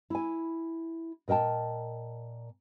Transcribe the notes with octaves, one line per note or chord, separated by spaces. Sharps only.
E4 G#5
A#2 A#4 D#5 G5 A5